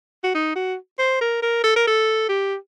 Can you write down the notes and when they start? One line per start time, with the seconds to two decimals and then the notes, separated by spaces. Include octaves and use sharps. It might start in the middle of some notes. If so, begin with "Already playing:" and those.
0.24 F#4
0.35 D#4
0.56 F#4
0.99 C5
1.21 A#4
1.42 A#4
1.64 A4
1.76 A#4
1.87 A4
2.29 G4